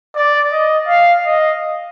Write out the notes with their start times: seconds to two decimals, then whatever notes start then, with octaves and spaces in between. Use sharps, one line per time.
0.16 D5
0.52 D#5
0.88 F5
1.25 D#5